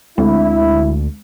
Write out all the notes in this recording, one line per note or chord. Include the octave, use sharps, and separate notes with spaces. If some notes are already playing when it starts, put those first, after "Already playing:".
D2 G#3 E4